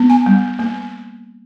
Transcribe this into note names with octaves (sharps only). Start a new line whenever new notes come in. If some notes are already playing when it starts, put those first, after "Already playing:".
Already playing: B3
G#5
G3
A#3